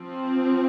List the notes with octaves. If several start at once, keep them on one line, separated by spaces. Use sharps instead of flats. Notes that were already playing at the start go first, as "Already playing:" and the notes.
Already playing: F3 C4